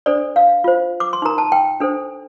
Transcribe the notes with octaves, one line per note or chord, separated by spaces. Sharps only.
D4 A4 C5 D5
F5
F4 C5
D6
C6
D#4 A#4 A#5
A5
G5
D4 A4 C5